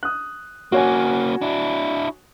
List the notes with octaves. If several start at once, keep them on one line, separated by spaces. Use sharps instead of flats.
D#6 F#6
A#3 C#4 F#4 C#5 G#5
D4 E4